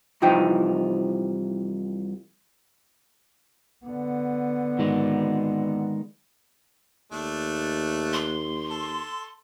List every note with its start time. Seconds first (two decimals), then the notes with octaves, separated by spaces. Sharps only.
0.22 C2 E3 F3 D#4 G5
3.85 D3 B3
4.79 D#3 G#3
7.12 D#2 A3 D4
8.13 C6
8.70 A4